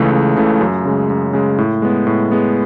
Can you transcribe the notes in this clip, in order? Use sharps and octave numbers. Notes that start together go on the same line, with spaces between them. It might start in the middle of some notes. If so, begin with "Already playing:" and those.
Already playing: C#2 C#3 E3 A3
C#2
C#3 E3 A3
F#2
C#3 G#3
F#2
C#3 G#3
A2
G#3 B3
A2
G#3 B3